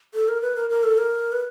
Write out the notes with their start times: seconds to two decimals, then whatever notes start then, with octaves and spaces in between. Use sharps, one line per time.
0.14 A4
0.28 A#4
0.42 B4
0.56 A#4
0.70 A#4
0.83 A4
0.98 A#4
1.32 B4